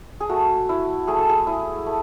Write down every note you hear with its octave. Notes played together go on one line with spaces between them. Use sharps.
G#4
A3 F#4
E4
A3 G#4
A4
G#4
E4
A3